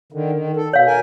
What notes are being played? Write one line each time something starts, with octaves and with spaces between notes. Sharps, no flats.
D3 D#3
D#3
A4
B2 C#5 F5
A#4 G#5